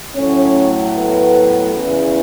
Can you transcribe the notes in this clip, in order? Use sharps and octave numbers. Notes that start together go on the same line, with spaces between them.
A2 F#3 A3 C#4 C#5
B3 B4
E2 C#3 E3